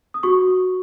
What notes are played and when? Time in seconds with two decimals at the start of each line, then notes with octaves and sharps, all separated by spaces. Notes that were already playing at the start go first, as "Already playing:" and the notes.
0.14 D#6
0.23 F#4 C#6